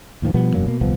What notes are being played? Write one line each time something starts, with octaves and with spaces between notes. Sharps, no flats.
D#2 A2 D#3 F3
B2 F3 G3 B3
E1 F#2 F#3 A#3
B2 A#3
D#1 C2 F3 B3